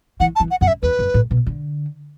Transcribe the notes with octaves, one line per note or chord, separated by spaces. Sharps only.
E3 F#5
A5
E3
F#5
F#2 F#5
E5
E2 B4
F#2
A2
B2
D3